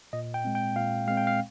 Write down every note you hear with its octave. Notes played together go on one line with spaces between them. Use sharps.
A#2 D#5
G5
G#3 C4
G5
A#2 F5
G#3 C4 F5
G5
F5